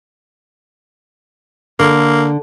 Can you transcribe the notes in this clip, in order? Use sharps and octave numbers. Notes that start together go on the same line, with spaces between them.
D3 A#3